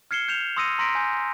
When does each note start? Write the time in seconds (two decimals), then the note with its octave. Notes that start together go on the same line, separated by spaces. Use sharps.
0.11 F6 G#6 C7 C#7 E7 G7
0.28 G6 C#7 E7 F7
0.57 C6 D#6 E6 A#6 C#7 D#7
0.79 A#5 C6 A#6 B6 D7
0.95 G#5 G6